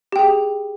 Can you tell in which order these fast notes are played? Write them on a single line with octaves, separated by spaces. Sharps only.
G4 G5 G#4